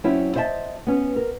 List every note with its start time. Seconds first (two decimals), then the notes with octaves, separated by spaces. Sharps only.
0.04 F#3 C4 C#4 E4
0.35 C5 D#5 E5 F#5 A5
0.87 B3 C#4
1.16 A#4